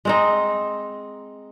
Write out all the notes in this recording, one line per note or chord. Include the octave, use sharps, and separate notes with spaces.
G#3 C4 D#4